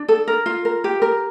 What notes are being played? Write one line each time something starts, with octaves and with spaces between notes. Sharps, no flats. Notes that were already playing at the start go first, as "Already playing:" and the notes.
Already playing: D4
A4
A#4
F4
A#4
G4
A#4